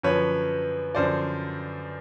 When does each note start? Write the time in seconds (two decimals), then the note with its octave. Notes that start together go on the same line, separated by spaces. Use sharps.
0.03 F#2 D3 F3 B4 C#5
0.95 F#2 D3 F3 C5 D5